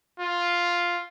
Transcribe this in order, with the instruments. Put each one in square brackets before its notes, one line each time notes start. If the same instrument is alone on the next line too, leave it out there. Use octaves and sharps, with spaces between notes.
[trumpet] F4